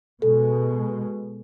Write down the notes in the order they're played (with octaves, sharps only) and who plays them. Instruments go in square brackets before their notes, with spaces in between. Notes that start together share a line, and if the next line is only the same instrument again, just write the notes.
[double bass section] B2 G#3 [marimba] A4